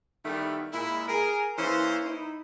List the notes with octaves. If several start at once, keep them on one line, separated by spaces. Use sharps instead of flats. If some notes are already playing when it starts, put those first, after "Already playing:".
D#3 G3 A3 B3 E4
A#2 G#3 E4
G#4 A#4
E3 A#3 C#4 C5
D#4 E4